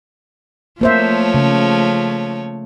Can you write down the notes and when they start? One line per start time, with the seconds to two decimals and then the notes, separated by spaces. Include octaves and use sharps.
0.81 F3 A3 A#3 C5 C#5 E5
1.34 C#3